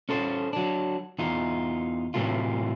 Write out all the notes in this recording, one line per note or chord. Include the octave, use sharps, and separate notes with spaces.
C#4 A4 C5
F#3 D4
E2 D#4 F4
A2 C3 E3 F#3 A3 F4